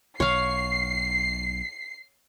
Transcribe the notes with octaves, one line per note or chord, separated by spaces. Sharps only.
B1 C#5 F5 C7